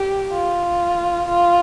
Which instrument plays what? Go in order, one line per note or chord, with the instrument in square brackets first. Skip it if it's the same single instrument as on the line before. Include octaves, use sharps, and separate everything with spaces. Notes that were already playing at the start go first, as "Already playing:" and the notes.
Already playing: [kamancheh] G4
F4
F4